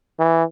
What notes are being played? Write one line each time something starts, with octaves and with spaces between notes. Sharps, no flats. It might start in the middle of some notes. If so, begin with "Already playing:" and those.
E3